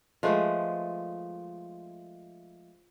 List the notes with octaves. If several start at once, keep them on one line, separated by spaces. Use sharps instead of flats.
F3 G#3 A3 B4